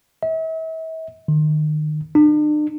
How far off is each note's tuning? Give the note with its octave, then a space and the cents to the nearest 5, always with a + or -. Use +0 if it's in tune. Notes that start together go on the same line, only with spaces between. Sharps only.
E5 -40
D#3 -35
D4 +40